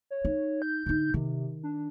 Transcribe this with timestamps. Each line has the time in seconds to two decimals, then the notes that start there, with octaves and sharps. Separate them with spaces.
0.11 C#5
0.25 D#4
0.62 G6
0.86 D3 D#4
1.14 C3 D#3
1.63 D4